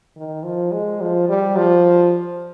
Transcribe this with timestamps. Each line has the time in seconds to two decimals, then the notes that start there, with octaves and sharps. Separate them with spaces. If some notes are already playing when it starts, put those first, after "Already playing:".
0.16 D#3
0.43 F3
0.72 G#3
1.01 F3
1.29 G3
1.56 F3